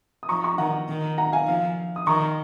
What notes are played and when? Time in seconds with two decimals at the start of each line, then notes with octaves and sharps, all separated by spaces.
0.23 D#6
0.29 F3 A#5 C#6
0.44 A#5 C#6
0.58 D#3 F#5 A#5
0.88 D#3
1.18 F#5 A#5
1.32 F5 G#5
1.47 F3 F5
1.96 D#6
2.07 D#3 A#5 C#6